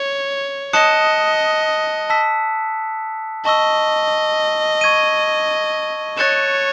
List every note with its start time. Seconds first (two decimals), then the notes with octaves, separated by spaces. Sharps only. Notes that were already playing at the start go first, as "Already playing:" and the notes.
Already playing: C#5
0.73 D#5 A5 D#6 F#6 C#7 E7
2.10 A5 E6 B6
3.45 D#5 A5 C#6 E6
4.81 C#6 G#6 D#7
6.17 C#5 F#6 A6 C#7 E7